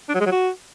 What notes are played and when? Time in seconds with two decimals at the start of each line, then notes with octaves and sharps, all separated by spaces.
0.09 D4
0.15 F#3
0.20 G#3
0.26 F#3
0.32 F#4